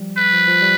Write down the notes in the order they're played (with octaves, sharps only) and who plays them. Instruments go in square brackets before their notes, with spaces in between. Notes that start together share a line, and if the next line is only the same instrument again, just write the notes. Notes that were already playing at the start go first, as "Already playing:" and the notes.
Already playing: [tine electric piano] F3 G3
[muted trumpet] B4
[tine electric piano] F3
F3
G3